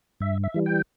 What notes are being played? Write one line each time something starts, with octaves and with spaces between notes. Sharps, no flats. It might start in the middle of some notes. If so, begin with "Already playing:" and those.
G2 E5
E5
E3 G3
G5